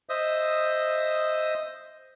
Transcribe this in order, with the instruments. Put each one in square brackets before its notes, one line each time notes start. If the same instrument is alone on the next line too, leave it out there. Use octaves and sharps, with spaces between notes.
[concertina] C5 D#5 E5 D#6